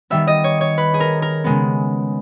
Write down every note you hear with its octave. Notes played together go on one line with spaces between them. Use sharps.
D#3 G3 B3 E5
D#5
C#5
C#5
B4
G#4
A#4
A#4
C#3 G#3 B3